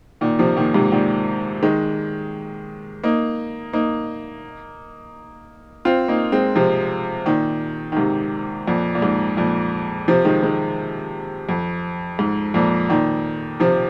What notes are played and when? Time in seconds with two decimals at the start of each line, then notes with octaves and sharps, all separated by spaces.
0.21 A#2 D#3
0.39 C3 F3
0.56 A#2 D#3
0.74 G#2 C3
0.92 A#2 D#3
1.63 D#3 G#3
3.04 A#3 D#4
3.73 A#3 D#4
5.85 C4 F4
6.08 A#3 D#4
6.32 G#3 C4
6.56 C3 F3
7.25 A#2 D#3
7.92 D#3
7.96 G#2 C3
8.67 F2 A#2
8.95 A#2
9.02 G#2
9.37 F2 A#2
10.08 C3 F3
10.25 D#3 G#3
10.43 D#3 G#3
11.49 F2
12.19 G#2
12.54 F2 A#2
12.89 A#2 D#3
13.60 C3 F3